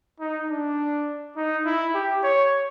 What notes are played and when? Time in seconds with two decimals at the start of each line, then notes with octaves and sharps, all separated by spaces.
0.20 D#4
0.50 D4
1.37 D#4
1.66 E4
1.95 G4
2.24 C#5